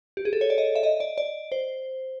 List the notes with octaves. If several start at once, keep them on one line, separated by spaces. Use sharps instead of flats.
G4
G#4
A4
C#5
D5
D#5
E5
D#5
D5
D5
C5